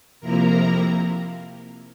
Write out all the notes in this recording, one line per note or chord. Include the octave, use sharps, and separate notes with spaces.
F2 C3 F3 A#3 E4 A#4 A#5